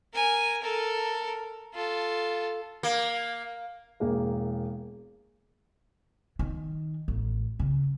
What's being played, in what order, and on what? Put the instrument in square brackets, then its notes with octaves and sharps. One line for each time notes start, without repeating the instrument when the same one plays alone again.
[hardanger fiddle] A#4 G#5
A4 A#4
F4 A4
[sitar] A#3
[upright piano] E1 A#3
[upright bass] D#3
A1
C#3